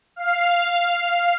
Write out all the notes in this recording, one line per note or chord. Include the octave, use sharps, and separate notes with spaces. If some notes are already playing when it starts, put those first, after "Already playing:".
F5